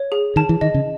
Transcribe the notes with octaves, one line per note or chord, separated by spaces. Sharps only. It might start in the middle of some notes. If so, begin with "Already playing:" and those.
Already playing: C#5
G#4
D#3 A5
E3
D#3 D#5
C#3